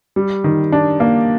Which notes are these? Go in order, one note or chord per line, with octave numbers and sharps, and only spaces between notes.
G3
D#3
D4
A#3